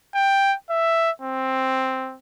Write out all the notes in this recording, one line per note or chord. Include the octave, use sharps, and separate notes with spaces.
G5
E5
C4